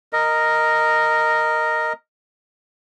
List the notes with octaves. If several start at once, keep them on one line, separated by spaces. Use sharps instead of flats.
A#4 D#5